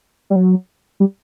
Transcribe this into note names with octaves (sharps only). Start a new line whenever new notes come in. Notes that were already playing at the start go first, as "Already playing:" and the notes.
G3
F#3
G3